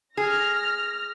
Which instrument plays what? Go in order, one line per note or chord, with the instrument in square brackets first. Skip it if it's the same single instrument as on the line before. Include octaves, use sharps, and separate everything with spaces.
[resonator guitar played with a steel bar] G#4 [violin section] F6 A#6